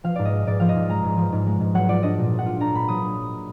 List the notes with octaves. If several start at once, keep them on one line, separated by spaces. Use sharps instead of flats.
F3 F5
G#2 D5
D#5
G#3
G#2 D5
F3 F5
D#5
G#2
G#3 A#5
G#2
F3
G#2
G#3
G#2
F#3 F#5
F4 D5
D4 D#5
A#2
F#3
F#5
F4
D4 A#5
A#2 B5
F#3 D#6